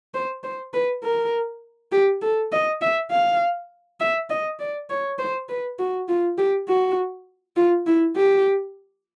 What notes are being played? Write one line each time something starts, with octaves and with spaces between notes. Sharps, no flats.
C5
C5
B4
A#4
G4
A4
D#5
E5
F5
E5
D#5
D5
C#5
C5
B4
F#4
F4
G4
F#4
F4
E4
G4